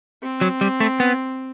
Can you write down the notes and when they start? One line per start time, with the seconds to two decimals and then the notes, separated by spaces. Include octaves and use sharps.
0.23 C4
0.41 F#3
0.61 G3
0.80 A3
1.00 B3